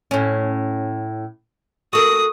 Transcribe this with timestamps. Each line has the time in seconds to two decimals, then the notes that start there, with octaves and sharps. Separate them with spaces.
0.11 A2 C#4
1.93 F#4 A4 A#4 D#6